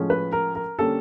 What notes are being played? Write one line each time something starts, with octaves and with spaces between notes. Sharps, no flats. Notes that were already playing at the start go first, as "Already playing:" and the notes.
Already playing: A2 F3 G#3 C#4
B4
A#4
A#4
D3 G3 A#3 C#4 A4